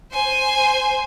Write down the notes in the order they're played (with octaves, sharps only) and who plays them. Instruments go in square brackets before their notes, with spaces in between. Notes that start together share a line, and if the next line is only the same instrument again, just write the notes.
[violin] C5 G#5